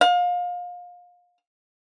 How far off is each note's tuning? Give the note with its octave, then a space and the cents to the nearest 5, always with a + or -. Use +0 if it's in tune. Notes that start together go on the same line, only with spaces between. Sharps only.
F5 +30